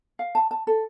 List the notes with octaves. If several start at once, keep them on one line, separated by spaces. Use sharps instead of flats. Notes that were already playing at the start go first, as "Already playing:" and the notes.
F5
A5
A5
A4